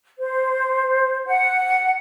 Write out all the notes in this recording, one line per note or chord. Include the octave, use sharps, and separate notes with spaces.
C5
F#5